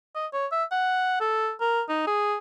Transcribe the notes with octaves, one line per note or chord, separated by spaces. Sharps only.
D#5
C#5
E5
F#5
A4
A#4
D#4
G#4